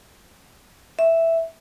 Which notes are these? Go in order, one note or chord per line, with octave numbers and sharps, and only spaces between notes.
E5